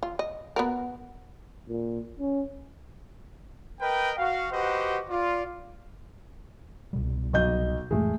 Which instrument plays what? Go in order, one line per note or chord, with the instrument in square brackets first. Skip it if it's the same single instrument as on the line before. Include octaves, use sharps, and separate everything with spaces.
[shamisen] F4
D#5
B3 F#4 A#4
[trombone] A#2
C#4
[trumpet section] A#4 B4 D#5 G5
F#4 F5
F#4 G4 B4 C5 D#5 F#5
F4 D5
[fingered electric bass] C2 B2 G3
[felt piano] B1 D#5 G6
[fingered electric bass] F2 A2 E3 [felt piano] G#3 A3